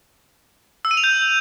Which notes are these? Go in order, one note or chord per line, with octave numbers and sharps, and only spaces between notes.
E6
D#7
F7
G6